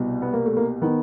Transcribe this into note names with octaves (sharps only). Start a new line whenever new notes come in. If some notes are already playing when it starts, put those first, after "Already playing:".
Already playing: C2 B2
B3
A#3
A3
A#3
D#3 B3